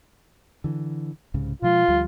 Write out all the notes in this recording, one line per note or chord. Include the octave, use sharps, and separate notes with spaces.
D3 E3
C2 G#2 C#3
B2 F3 G#3 F4
D2 F3 G3